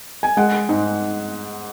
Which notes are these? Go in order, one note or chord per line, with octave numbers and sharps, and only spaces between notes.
G#5
G#3 F#5
G#2